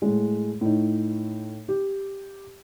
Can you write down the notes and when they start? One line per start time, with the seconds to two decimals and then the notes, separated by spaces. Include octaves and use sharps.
0.02 A2 G#3
0.61 A2 D#4
1.68 G4